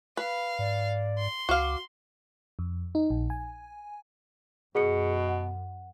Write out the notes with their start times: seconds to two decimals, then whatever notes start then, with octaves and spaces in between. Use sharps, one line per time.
0.17 B4 F5
0.59 G#2 D5
1.18 C6
1.49 C#2 F#4 F5 D6
2.59 F2
2.95 D#4
3.10 A#1
3.30 G#5
4.75 F#2 B2 G#4 C#7
5.28 F#5